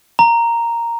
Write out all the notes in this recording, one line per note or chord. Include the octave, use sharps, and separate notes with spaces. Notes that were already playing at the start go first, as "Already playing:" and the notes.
A#5